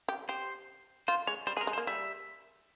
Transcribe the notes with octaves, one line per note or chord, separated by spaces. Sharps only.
G4
G4 C5
F4 C5
G#3 C#5
G3 C5
G#3 G#4
A#4
G#3
C5
A#3
G3 E5